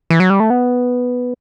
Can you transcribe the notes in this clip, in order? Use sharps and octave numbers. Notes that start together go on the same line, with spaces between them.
E3
F#3
G3
A3
B3